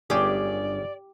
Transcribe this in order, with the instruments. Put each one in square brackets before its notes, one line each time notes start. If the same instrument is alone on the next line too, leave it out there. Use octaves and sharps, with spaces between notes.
[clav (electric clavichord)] G1 C#4 G#4 [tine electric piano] G2 [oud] G4 [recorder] D5